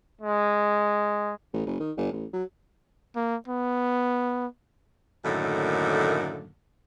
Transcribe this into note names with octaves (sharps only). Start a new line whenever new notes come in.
G#3
A1
F#1
D#3
G1
A1
F#3
A#3
B3
F#2 A2 D3 D#3 A3 A#3